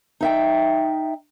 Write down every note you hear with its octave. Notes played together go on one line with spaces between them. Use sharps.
D#4 E5 G5